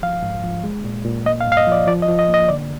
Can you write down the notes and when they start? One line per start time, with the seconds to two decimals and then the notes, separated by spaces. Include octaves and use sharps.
0.02 F3 F5
0.22 G#2
0.44 F3
0.64 G#3
0.84 A#2
1.05 A#2
1.26 A#3 D#5
1.41 F5
1.47 G2
1.52 F5
1.57 D#5
1.67 F3 D5
1.87 F3 D5
2.02 D#5
2.09 F3
2.19 D#5
2.28 A#3
2.34 D#5
2.48 D3 D5